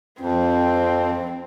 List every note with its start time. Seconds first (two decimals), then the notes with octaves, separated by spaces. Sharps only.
0.21 F2 C4